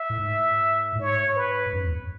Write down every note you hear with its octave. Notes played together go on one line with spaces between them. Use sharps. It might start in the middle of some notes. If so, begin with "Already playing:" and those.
Already playing: E5
A2
G#2
A2
G#2 C#5
B4
F#2
E2